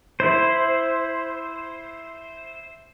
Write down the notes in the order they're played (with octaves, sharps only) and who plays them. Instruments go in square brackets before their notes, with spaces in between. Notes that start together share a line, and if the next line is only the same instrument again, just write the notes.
[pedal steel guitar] E4 C5